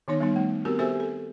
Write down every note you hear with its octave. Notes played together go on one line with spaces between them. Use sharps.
D#3 B3 D#4 C#5
G3 B3 D#4
A3
B3 C4 F#4 G4 A#4
F#4 G4 A4 C5 E5 G#5
A4